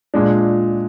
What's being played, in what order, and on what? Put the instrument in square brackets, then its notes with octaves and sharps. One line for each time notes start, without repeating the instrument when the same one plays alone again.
[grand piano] A#2 G#3 D4